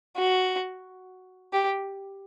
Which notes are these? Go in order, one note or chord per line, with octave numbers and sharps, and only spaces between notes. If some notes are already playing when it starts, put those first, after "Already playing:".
F#4
G4